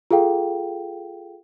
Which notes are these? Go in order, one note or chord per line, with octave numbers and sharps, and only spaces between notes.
F4 G#4 A4 F5 G5